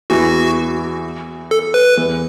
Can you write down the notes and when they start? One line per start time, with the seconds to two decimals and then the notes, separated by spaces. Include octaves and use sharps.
0.10 E2 E3 F#4
1.51 A4
1.74 B4
1.97 E2 E3